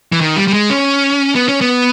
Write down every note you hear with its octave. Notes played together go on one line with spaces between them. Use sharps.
E3
D#3
G3
G3
G#3
C#4
B3
C#4
B3